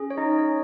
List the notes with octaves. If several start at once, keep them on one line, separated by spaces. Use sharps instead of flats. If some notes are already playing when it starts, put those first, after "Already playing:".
Already playing: C#4 G#4
C#5
D#4 D#5
C#5